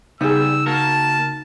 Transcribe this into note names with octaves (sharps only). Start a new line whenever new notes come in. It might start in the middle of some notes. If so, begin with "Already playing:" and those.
C#3 G3 B3 D#4 G#4 E6
A#3 F#4 A#4 A5